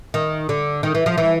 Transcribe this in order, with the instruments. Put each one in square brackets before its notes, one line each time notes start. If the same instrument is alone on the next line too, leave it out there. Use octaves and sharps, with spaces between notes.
[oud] D#3
D3
D#3
E3
F3
E3